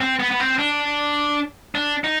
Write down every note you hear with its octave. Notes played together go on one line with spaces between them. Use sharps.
C4
B3
B3
C4
D4
D4
D#4